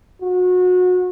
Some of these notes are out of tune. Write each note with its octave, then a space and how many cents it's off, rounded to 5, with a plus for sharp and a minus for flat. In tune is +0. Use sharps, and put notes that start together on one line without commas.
F#4 -30